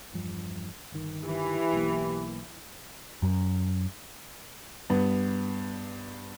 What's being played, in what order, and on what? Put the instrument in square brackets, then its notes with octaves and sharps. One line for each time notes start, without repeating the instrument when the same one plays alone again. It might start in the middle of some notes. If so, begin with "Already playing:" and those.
[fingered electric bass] E2 G2 F3
G1 D#3
[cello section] E3 [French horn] G4
[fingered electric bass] B1 A#3
[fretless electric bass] F#2
[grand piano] G2 B3